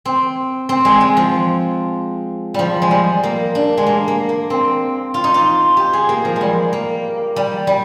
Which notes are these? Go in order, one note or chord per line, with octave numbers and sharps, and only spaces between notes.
C4
C4
G#3
G#3
F3
F3 G3
G#3
G3
A#3
D4
G#3
A#3
A#3
A#3
C4
F4
D#4
F4
G4
G#4
A#3
F3
G#3
G3
A#3
G3
G3